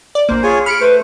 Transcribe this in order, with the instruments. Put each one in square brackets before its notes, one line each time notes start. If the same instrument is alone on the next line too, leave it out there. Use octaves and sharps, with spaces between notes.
[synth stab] D5
[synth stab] A#1 A#3 [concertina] C5
[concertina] F4 C#5 G#5 [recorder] G#4
[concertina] B5 [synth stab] F6 C#7 D7
[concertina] A3 C5 [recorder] B4